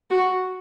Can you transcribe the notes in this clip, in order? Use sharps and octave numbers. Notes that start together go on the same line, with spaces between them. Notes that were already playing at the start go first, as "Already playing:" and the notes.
F#4